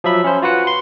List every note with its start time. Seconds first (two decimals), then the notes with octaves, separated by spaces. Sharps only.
0.04 F3 F#3 E5 B5
0.24 C#4 C5
0.42 F4 F#4 B4 F#5
0.67 C6